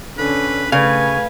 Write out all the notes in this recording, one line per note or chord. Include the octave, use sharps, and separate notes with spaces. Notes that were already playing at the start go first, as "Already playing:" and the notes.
D3 C#4 B4
C#3 A3 B4 F5 G#5